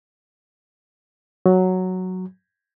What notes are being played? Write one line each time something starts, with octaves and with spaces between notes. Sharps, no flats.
F#3